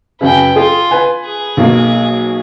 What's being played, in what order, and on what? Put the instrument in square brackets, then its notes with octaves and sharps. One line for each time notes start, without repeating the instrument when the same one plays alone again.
[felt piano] F#2 C#3 [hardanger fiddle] B4 G5
[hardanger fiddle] F4 [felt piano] G#4
[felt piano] B4 G#5
[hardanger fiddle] G#4
[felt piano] B1 F#3 A#3